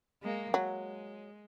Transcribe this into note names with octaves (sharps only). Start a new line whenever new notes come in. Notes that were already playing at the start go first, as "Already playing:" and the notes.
G#3 A#3
F#3 G#3